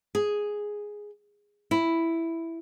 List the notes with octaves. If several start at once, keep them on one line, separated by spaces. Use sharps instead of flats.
G#4
E4